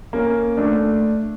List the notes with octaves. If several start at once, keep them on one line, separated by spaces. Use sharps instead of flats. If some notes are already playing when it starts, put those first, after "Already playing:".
A#3 C#4
A3 D4